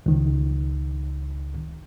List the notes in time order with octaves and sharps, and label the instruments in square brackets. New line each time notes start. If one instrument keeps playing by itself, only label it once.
[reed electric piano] C#2 D#3